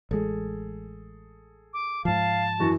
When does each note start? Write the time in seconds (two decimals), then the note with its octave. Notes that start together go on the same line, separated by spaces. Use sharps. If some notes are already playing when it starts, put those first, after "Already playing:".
0.11 A1 G#3 G#4 A4
1.73 D6
2.05 G#2 F3 F5 A5
2.60 F#2 E3 F#4